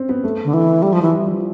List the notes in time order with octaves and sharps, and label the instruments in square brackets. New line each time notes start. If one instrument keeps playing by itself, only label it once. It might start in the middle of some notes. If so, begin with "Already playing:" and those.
Already playing: [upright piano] C4
B3
A3
[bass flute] D3
E3
G3
F3
E3
[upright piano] G3
F3